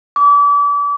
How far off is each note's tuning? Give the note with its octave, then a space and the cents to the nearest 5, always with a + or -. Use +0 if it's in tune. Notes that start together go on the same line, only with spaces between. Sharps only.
D6 -35